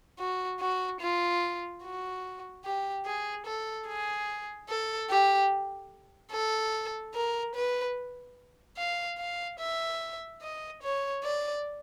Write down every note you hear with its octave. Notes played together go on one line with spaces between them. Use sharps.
F#4
F#4
F4
F#4
G4
G#4
A4
G#4
A4
G4
A4
A#4
B4
F5
F5
E5
D#5
C#5
D5